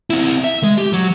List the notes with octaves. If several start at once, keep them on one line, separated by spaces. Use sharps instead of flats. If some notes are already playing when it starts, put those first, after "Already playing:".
C4 E4
E5
G#3
G4
F#3